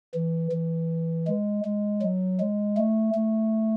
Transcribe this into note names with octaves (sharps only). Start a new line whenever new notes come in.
E3
E3
G#3
G#3
F#3
G#3
A3
A3